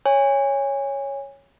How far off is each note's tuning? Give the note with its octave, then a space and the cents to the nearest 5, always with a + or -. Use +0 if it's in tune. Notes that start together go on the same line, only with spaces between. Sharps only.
C#5 +0 G#5 -25